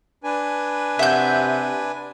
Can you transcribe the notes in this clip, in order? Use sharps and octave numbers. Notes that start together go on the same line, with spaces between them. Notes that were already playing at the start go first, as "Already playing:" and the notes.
D4 B4 G#5
C3 E4 F#4 G#4 E5 G6